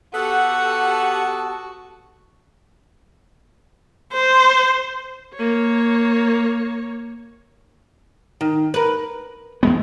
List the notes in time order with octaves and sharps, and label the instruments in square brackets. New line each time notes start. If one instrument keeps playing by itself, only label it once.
[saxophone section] B3 A4 [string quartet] F#4 [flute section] G4 A5 [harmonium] F#5
[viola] C5
A#3 C#5
[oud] D#3
A#4 B4
[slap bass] E2 G#3 B3